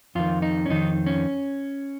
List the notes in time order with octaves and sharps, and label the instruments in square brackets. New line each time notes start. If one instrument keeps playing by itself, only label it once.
[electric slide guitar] F2 D#3 F4
D#4
C#4
F2 D#3 D#4
C#4